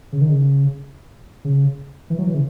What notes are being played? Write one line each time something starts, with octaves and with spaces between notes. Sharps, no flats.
C#3
D#3
C#3
C#3
E3
F#3
E3
C#3